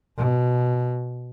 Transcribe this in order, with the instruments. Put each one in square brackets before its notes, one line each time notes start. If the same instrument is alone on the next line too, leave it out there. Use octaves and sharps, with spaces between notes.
[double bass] B2